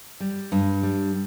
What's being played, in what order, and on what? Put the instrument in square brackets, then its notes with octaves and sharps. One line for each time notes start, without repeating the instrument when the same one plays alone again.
[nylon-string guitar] G3
G2
G3